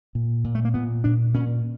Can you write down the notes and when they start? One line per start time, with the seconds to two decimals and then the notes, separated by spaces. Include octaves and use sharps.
0.15 A#2
0.44 A#2
0.55 A3
0.65 A#3
0.74 A#2 B3
1.04 A#2 D4
1.34 A#2 C#4